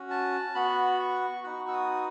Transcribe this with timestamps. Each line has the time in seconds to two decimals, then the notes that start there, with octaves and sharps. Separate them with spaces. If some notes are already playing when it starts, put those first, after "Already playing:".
Already playing: C#4 F#4
0.11 A5
0.55 B3 F#4 B5
0.99 C#6
1.44 B3 D#4 F#4 C#6
1.68 E6
1.73 D#6